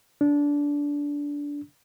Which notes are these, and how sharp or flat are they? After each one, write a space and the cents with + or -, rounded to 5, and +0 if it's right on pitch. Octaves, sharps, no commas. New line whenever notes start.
D4 -20